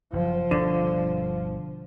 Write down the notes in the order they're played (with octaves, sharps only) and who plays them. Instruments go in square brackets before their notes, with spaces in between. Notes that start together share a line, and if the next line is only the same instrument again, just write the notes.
[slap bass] F#1 [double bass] F3
[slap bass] G1 G2 B2 [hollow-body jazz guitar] D3